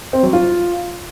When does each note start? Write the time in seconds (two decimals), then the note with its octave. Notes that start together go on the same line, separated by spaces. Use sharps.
0.13 C4
0.23 F#3
0.33 F4